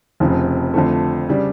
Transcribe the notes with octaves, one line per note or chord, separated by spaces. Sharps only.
F1 F2 C#3 F3
F2 D3 F3 A3
C#3 G3 D4